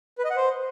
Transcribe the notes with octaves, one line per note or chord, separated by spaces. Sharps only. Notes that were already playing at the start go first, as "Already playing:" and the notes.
B4
D#5
F#5
C5